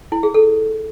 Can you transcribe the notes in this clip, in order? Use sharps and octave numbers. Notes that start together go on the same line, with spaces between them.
E4
G#4
A4